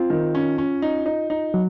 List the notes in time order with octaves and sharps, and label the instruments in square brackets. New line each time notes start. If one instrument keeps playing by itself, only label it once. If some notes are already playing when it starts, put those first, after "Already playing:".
Already playing: [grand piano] C4 [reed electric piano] F4
[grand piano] D#3
C#4
C#4
D#4
D#4
D#4
[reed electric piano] F#3